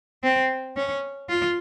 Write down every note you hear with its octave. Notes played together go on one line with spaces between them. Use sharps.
C4
C#4
F4